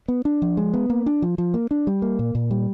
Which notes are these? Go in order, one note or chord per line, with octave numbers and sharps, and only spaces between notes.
B3
D4
F3
G#3
B3
A#3
D4
F3
F3
A#3
D4
G3
A#3
A#2
A#2
G3